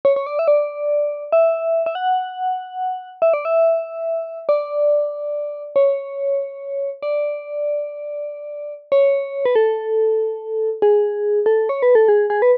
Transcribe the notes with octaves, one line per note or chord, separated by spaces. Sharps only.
C#5
C#5
D5
E5
D5
E5
E5
F#5
E5
D5
E5
D5
C#5
D5
C#5
B4
A4
G#4
A4
C#5
B4
A4
G#4
G#4
B4